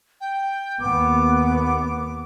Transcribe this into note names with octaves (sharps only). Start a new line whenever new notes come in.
G5
D#2 B3 D6